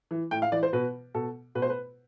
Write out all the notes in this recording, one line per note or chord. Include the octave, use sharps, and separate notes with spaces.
E3
A2 G5
F5
E3 D5
C5
B2 B4
B2 A4
B2 B4
C5
B4